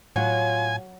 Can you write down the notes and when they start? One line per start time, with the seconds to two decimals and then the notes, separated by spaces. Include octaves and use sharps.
0.16 A2 F#3 F4 G#5